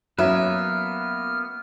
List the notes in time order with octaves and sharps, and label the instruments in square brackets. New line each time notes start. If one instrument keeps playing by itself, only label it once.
[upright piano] F#3 C#4 [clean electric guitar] A#3 B3 B4 [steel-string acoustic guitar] E5 [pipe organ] F6